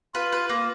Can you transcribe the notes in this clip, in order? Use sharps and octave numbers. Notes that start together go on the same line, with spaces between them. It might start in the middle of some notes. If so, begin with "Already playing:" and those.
F4 B4
B4
A#3